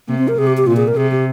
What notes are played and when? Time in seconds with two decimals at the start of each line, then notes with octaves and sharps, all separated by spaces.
0.09 C3 A#3
0.18 C4
0.28 A#4
0.38 C3 G#4
0.47 G4
0.57 G4
0.67 A#2 F4
0.77 G#4
0.88 A#4
0.96 C3 G#4
1.11 G4